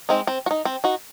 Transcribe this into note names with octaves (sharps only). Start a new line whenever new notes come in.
G#3 C4 D#4
C4
F#4
D#4
C4
D#4 F#4